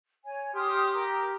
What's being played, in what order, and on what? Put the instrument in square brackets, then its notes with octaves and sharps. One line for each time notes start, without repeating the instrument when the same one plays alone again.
[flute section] C#5 G#5
[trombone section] G4 [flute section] C6 D#6 F6
[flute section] A#4